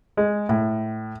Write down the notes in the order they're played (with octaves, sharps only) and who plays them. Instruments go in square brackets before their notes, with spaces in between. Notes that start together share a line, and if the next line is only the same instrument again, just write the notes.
[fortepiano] G#3
A2